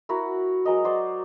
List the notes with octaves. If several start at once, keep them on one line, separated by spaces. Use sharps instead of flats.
E4 F#4 A#4 F#5
F#3 G#3 A#4 D#5
F#4 C5 D5